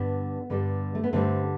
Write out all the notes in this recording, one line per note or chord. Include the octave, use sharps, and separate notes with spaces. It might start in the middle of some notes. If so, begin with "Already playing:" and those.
Already playing: G2 D3 G3 B3
G2 D3 G3
A3
B3
G2 D3 G3 A3 C4